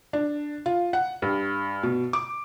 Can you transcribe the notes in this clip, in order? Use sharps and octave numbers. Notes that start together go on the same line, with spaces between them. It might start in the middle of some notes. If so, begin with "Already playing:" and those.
D4
F4
F#5
G2
B2
D6